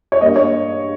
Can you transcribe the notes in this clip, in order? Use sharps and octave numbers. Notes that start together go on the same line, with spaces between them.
C#5
G2 G3 A#3 D#5
C#5